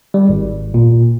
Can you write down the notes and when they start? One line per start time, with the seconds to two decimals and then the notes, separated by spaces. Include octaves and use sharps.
0.14 G3
0.29 G#1
0.74 A#2